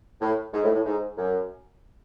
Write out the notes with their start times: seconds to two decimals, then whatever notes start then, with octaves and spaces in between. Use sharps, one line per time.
0.21 A2
0.54 G#2
0.64 A2
0.75 A2
0.86 G#2
1.18 F#2